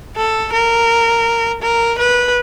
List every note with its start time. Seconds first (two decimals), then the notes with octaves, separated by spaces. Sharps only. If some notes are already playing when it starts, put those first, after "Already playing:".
0.16 A4
0.53 A#4
1.63 A#4
1.99 B4